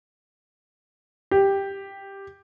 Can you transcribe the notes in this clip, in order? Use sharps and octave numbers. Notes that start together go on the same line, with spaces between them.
G4